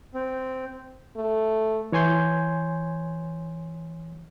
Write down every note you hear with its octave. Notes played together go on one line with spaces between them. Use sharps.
C4
A3
E3 C#5 G#5 C6 G6 G#6